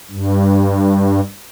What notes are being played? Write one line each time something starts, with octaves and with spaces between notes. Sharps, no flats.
G2